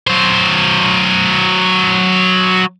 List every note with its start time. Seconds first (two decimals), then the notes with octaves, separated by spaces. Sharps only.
0.07 F#3 C5